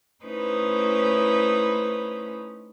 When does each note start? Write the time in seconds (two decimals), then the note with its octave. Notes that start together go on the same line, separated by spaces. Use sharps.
0.24 A3 C#4 D#4 E4 B4 C5